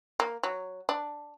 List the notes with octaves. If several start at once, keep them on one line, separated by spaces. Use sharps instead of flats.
A#3
F#3
D4